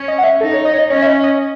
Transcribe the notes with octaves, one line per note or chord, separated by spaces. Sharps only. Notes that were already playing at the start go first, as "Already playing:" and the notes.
Already playing: C#4
D#5
F#5
E5
D#4 A4
C#5
D#5
C#5
D#5
C#4 C#5
E5
D#5
D#5